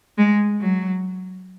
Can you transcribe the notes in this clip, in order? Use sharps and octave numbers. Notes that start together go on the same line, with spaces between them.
G#3
F#3